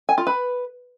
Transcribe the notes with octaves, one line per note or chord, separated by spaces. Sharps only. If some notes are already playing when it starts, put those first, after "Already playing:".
G#5
F4
B4